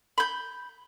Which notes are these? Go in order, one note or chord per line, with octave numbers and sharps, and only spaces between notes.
B5 G6